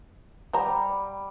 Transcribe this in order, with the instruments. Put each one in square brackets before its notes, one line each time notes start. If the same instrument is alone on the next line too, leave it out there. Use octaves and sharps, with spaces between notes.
[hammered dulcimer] G3 [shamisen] C5 A#5